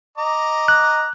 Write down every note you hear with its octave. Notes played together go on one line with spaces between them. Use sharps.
D#5 A#5 D6
F#6